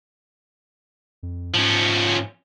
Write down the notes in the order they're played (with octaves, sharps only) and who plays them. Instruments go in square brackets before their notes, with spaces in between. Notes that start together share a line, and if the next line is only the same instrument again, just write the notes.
[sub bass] F2
[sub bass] G#2 [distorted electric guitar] F3 C#4